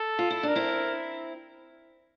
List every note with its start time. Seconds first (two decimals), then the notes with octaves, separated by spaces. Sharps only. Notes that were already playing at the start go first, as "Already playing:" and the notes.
Already playing: A4
0.19 F4
0.31 E4
0.43 D4
0.48 A#4
0.55 C4 E4